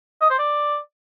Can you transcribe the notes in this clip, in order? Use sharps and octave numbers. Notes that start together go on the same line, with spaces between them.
D#5
C5
D5